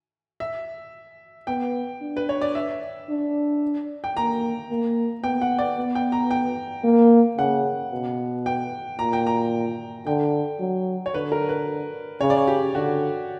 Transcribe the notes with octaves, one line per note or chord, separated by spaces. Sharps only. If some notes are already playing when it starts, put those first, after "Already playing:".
E5
B3 G5
D4
B4
C#5
D5
E5
D4
G5
A#3 A#5
A#3
B3 G5
F#5
D5
B3
G5
A#5
G5
A#3
C#3 F#5
B2
G5
A#2 A#5
G5
A#5
D3 G5
F#3
C#5
D3 B4
A#4
B4
C#3 C#5
D5
C#5
G4
D3 F#4